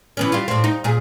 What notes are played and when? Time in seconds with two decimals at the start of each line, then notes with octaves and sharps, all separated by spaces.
0.17 E3 B3 C#4
0.32 G3 F4
0.48 A2 C4
0.64 D#4
0.84 A#2 G#4